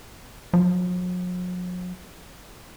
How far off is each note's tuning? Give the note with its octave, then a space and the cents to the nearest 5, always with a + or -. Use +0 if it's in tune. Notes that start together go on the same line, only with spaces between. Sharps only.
F#3 -45